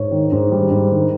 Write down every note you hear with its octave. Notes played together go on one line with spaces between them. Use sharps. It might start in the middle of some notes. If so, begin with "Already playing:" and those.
Already playing: G#2 C#5
D#3
G#2
G3
G#2
D#3